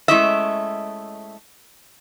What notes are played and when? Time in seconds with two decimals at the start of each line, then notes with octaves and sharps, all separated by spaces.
0.08 G#3 A3 C#4 E4 D#5 E5